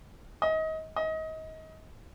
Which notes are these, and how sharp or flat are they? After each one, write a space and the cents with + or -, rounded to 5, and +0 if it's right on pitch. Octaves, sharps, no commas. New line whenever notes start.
D#5 +30
D#5 +30